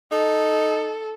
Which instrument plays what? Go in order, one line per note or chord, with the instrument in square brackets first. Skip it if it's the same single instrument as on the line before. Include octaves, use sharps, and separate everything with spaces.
[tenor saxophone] D#4 [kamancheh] A4